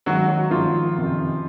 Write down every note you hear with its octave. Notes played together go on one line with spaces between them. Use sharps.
G#1 G#2 D#3 F#3 F#4
F#3 F#4
G#1 G#2 D#3 F3 F4
F#1 F2 C3 D#3